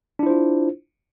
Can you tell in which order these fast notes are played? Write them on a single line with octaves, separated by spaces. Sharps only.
D4 E4 C5 F4